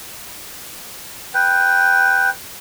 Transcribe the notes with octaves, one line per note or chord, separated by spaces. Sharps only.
B4 G5